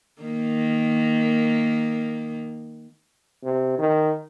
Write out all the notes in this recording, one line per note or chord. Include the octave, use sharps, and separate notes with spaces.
D#3 A#3
C3
D#3